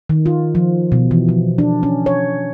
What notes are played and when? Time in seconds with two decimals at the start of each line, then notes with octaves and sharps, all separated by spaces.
0.10 D#3
0.26 F4
0.55 F3
0.92 B2
1.11 E3
1.29 F3
1.58 D4
1.83 C#4
2.06 C#5